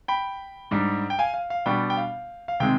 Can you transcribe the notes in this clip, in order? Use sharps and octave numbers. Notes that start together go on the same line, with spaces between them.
G5 B5
G#2 G3 D4
G5
F5 G#5
F5
F5
B2 G3 B3 D4 G5
G5
F5
F5
C3 D#3 G#3 C4 G5